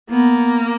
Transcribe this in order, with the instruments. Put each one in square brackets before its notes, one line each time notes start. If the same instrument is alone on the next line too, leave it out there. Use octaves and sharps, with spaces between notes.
[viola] A#3 [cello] B3